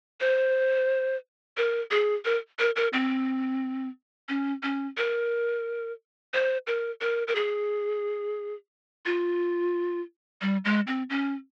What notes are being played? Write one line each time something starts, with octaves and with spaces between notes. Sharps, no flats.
C5
A#4
G#4
A#4
A#4
A#4
C4
C#4
C#4
A#4
C5
A#4
A#4
A#4
G#4
F4
G3
G#3
C4
C#4